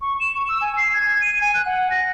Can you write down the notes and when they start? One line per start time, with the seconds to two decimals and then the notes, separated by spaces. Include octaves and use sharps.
0.01 C#6
0.20 E7
0.35 C#6
0.49 E6
0.61 G#5
0.77 C7
0.93 G#6
1.21 D#7
1.41 G#5
1.54 F#6
1.66 F#5
1.91 A#6